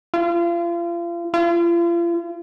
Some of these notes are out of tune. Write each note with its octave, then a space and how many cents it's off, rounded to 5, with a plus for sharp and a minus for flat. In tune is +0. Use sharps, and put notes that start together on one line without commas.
F4 -35
F4 -40